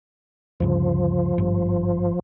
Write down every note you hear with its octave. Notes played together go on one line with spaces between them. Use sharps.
D2 G2 C#3 F3
G#1 G2